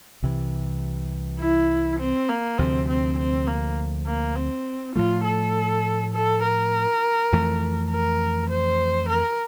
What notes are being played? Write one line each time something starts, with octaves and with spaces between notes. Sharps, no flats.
C2 C3 E3
E4
C4
A#3
D2 C3 F3 C4
C4
C4
A#3
A#3
C4
A2 F3 A3 F4
A4
A4
A#4
F2 E3 A3
A#4
C5
A#4